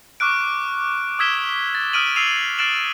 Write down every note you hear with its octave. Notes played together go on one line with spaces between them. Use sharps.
C#6 D6 F6 F#6 D7
D#6 E6 G#6 B6 E7 G7
A6
D#6 F6 D7 D#7 F#7
E6 C7 D#7 F7
F6 A6 C7 D7 E7 F#7